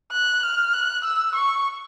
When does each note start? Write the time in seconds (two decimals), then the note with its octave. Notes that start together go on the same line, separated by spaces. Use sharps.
0.12 F#6
0.43 F6
0.73 F#6
1.04 E6
1.35 C#6